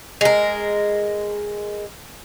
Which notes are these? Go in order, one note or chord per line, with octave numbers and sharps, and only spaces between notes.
G#3 A#4